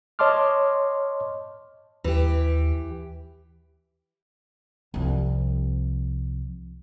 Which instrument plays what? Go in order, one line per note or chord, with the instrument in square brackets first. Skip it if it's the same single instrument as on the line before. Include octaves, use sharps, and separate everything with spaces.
[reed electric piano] C#5 D#5 A5 C6 D6 F6
[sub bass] D#2 [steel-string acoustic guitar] E3 G4
[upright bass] C2 F3